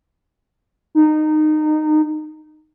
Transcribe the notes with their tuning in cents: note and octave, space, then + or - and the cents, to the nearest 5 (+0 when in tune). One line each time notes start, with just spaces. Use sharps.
D#4 -20